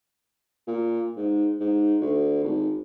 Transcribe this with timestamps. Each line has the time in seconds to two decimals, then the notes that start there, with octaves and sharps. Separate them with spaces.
0.67 A#2
1.17 G#2
1.60 G#2
2.01 D2
2.44 G#1